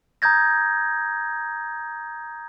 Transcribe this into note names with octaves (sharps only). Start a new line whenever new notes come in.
A#5 D#6 G6 G#6 A#6